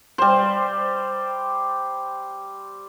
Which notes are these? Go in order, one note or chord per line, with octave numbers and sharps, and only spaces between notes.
G3 C5